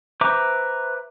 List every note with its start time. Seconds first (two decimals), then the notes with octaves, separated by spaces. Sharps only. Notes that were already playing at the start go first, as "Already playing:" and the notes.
0.21 B4 C5 E5 A#5 D6